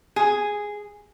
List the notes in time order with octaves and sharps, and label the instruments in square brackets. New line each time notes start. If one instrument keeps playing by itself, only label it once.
[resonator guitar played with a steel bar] G#4